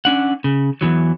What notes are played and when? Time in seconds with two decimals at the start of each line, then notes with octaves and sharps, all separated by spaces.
0.05 C#4 D4 F#5
0.44 C#3
0.81 E2 A#2 E3 F#3